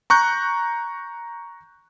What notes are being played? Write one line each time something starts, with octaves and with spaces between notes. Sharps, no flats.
A#5 C#6 F#6 G6